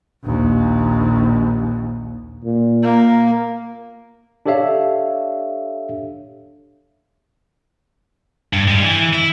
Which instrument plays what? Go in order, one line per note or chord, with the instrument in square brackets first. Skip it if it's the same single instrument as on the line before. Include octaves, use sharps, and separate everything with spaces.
[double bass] A#1 D#2
[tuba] A#2
[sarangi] A#3
[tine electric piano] D4 G4 A4 C#5 E5 F5
[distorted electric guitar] G2
G3 G#3
E3
E4